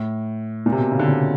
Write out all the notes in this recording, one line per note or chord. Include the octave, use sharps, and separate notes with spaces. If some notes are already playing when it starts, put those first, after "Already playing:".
Already playing: A2
A#2
C3
B2
C#3
D3
C#3